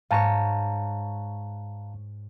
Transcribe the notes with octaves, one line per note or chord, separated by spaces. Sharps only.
G#2 C#5 F5 A5 A#5